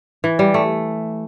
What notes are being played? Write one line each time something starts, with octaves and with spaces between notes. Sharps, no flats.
E3
G3
A3